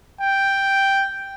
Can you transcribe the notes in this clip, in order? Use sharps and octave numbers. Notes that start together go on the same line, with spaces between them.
G5